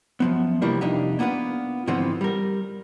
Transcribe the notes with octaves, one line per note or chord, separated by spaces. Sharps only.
F#2 F3 B3
C3 E3 F3 G3 A#3 D4
C2 F2 D4 D#4 G4
A#3 B3 D4 F4 B4
G#2 D3 E3 F3 B3 C4
G3 A#4